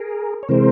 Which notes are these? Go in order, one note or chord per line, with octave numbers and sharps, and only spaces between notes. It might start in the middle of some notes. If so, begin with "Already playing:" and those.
Already playing: G#4 A#4
C#5
C3 E3 G#3 C4 A#4 C5